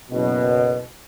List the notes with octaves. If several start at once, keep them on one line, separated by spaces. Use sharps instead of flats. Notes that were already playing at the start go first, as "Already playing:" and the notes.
F#1 B2